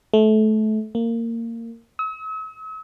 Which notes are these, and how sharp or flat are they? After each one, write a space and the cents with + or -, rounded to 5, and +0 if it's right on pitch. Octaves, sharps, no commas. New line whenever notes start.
A3 -25
A#3 -20
E6 -45